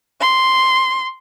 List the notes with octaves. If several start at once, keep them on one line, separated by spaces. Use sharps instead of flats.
C6